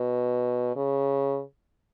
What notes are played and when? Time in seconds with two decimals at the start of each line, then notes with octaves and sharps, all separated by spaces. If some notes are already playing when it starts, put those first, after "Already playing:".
Already playing: B2
0.76 C#3